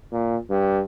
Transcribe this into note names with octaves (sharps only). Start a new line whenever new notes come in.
A#2
G2